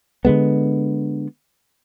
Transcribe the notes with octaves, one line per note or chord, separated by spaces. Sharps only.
D3 E3 G#3 B3